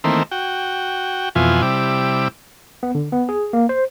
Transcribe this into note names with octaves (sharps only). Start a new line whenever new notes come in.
D#3 E3 A3 A#3 C4
F#4 G5
F2 B2 E3 F4 G#5
C3 G3 E4 D6
B3
D3
B3
G#4
A#3
C5